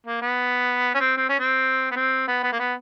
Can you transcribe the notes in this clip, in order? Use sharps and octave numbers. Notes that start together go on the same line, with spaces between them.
A#3
B3
C#4
C4
C4
C#4
C4
B3
C4
B3
B3
A#3
B3